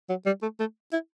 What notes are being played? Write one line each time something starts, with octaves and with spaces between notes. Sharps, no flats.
F#3
G3
A3
A3
E4